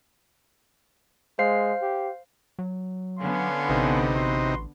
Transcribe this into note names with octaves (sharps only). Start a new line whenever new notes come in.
G#3 C5 F5 C7
G4
F#3
D3 B3 C#4 F5 C6
A1 C3 D#4
F#4 B4 C6